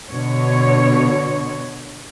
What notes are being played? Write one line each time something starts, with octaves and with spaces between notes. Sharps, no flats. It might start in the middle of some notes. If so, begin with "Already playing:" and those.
B2 D3 C#5